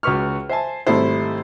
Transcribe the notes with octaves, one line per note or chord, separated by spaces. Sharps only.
C#2 F#4 B4 C#6 F6
C5 E5 G#5 A5
G#1 C3 G3 A3 E4 C5